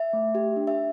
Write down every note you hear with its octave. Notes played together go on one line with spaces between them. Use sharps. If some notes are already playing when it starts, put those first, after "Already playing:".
Already playing: E5
A3
G4
D4
E5